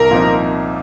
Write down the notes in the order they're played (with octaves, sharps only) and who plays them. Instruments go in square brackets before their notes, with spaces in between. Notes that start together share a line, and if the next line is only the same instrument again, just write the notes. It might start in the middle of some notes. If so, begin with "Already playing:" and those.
Already playing: [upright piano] C2 [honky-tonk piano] A#4
[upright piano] A#2 F3 C4 D#4